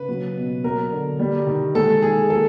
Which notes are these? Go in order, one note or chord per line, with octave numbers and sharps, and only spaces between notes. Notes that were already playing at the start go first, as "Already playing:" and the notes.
Already playing: C#3 B4
F#3
B2
F#3 A#4
D3
G3
D#3
G#3 A4
D#3 G#4
A#3 A4